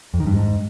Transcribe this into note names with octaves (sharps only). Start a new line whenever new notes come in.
F2
D#3
G2
G#2